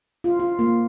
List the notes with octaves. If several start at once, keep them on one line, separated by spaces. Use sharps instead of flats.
F4
F4
A#3